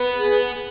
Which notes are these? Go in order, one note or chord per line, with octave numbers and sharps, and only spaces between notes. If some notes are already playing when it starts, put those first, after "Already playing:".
Already playing: B3 B4
G#4